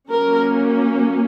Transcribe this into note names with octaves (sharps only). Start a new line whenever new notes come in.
F#3 A#3 C#4 A#4